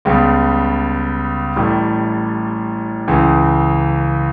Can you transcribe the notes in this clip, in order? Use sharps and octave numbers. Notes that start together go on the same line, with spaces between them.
C#2 C#3 G3 B3
A1 A2 G3
C#2 C#3 E3